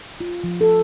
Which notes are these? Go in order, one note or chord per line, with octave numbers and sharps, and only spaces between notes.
F4
F3
A4